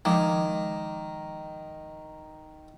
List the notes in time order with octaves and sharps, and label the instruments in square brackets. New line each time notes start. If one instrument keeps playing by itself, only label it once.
[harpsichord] D#3 [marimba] F3 G#3 D6